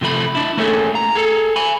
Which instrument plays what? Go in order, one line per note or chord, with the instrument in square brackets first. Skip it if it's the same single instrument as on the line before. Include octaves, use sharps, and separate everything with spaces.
[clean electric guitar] C3 F3 A3 B5
D4 E4
A3 A#3 C#4 G#4 A4
A#5
G#4 A4
G#5 B5